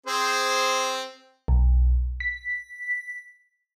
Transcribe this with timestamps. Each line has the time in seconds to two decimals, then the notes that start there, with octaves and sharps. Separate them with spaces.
0.07 C4 G#4 C5
1.48 B1
2.20 B6